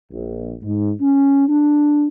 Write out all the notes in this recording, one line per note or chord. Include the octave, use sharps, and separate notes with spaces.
A#1
G#2
C#4
D4